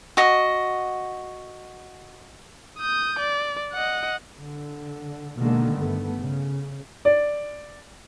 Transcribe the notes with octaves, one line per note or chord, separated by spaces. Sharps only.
F#4 D#5
D#6 G6
D5
D#5 F#5
D3
B2 D3 D#3 G#3 A#3
G2 A3 B3
C#3
D5